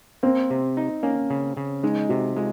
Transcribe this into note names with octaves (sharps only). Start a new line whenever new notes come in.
A#3 C4
C3
D#4
A#3 C#4
C#3
C#3
G#3 D#4
C3 F#4
G#3 F4